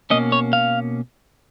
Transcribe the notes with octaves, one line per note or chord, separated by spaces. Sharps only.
B2 A#3 C#4 D#5
C#5
F5